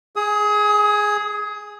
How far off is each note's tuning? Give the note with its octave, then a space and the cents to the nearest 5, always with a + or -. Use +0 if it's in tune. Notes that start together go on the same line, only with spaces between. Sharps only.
G#4 +0 D#6 +30